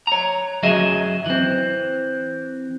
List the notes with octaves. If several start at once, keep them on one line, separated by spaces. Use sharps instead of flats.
C#5 A#5
F#2 F#3 F#4 G#4 D#5 E5
E3 C4